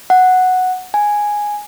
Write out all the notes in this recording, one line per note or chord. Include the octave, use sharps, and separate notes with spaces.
F#5
G#5